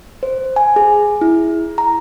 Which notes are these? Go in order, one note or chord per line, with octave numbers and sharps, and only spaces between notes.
C5
G#5
G#4
E4
A#5